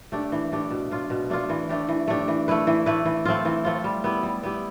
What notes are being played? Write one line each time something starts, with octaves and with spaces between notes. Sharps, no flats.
A3 D4 G4
E3
A3 D4 G4
B2
A3 D4 F4
B2
A3 D4 F4
E3
A3 D4 G4
E3
A3 D4 G4
E3
A3 E4 B4
E3
A3 E4 B4
E3
A3 C4 F4
E3
A3 C4 F4
G3
B3 E4 G4
G3
B3 E4 G4